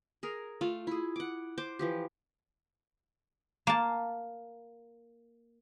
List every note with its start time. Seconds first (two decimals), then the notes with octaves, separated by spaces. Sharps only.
0.23 G#4 A#4
0.61 A3 F4
0.87 E4 G#4
1.16 F#5 D6
1.58 C5 D6
1.79 E3 F3 G4
3.67 A#3 A5